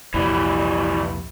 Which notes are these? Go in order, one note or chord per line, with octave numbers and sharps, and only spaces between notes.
C2 F2 A#2 E3 G3